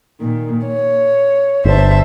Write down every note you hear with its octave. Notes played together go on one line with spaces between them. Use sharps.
A#2 D#3
C#5
G1 C5 E5 A5